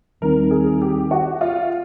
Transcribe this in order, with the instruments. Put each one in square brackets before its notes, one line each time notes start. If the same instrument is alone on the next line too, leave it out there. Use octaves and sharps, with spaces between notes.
[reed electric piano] D#2 D#3 G3 C4 D#4 [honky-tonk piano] A#4
[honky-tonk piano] G#4
G4
F#4
F4